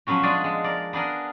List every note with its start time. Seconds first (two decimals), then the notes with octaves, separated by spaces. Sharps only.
0.07 F3 F#3 B3 C#4 F#4
0.23 G#3 D4 F4 G#4 D5
0.44 G#3
0.64 A#4 D5
0.93 B3 D4 G#4 A#4